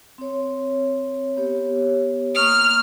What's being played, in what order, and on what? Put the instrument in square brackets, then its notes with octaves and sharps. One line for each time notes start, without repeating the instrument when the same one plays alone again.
[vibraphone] C4 C#5
B3 G4 C#5
[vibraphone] A#3 C#6 D#6 [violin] F6